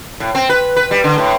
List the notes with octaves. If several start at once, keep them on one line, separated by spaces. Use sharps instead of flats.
A2
C4
B4
B4
G3
D3
A2